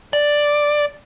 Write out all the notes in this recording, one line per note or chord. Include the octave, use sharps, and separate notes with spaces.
D5